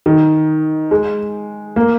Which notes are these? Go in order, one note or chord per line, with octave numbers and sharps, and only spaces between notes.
D#3
G#3
A#3